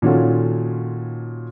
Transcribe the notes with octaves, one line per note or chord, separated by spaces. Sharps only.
A#2 D#3 C#4 F4 F#4 A4